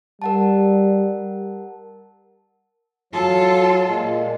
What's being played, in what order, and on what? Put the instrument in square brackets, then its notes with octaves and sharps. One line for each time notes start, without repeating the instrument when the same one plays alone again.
[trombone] G3 [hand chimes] A#4 F#5 A5
[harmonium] F#3 [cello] F4 A4
[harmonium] A#2 G#3